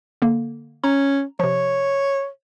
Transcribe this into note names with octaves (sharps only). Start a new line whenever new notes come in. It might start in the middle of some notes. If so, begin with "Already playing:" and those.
D3 A#3
C#4 A#5
C3 F3 C#5